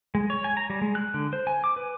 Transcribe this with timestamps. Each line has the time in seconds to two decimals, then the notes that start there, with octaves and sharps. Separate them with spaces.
0.15 G#3
0.30 C#5
0.44 G#5
0.57 A#5
0.70 G3
0.82 G#3
0.95 F#6
1.14 D3
1.33 C5
1.47 G#5
1.64 D6
1.76 B4